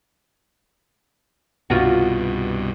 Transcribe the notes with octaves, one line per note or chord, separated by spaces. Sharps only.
C2 G2 B2 F4 F#4